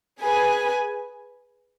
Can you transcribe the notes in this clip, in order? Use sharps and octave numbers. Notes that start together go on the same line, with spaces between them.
G#4 B4 G#5